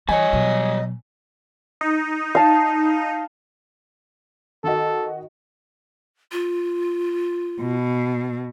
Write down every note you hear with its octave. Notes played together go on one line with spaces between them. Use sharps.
E3 G3 C#5 D#5 G#5
B2 F#3
D#4
F5 A5
D#3 F#4 A4 D#5
F4
B2